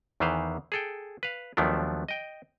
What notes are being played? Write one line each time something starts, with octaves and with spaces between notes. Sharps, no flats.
E2 D#3 E3 B4 C5 F5
G#4 A4 G5
B4 F5
D#2 F3 F#3 A3 B3 D4
D#5 G5